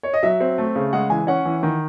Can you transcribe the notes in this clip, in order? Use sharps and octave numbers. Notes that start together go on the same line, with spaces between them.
C#5
D#5
F#3 E5
C4
A3
C#3
G#3 F#5
E3 G#5
C#4 F#5
E3
D#3